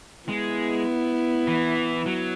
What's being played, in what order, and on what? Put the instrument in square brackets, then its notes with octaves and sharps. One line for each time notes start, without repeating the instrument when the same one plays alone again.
[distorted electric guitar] G#3 [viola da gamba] B3 E4
[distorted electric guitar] E3
F#3